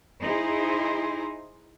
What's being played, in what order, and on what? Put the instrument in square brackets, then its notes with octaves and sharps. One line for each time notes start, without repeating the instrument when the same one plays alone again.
[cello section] D#4 E4 G#4 C5